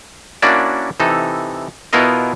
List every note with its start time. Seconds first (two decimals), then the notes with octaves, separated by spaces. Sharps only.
0.42 A#3 C#4 D4 E4 F#4 D5
1.00 C3 E3 D#4 A4
1.93 B2 B3 E4 F4 A#4 D#5